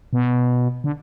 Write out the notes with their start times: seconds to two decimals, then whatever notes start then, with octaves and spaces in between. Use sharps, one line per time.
0.13 B2
0.84 D3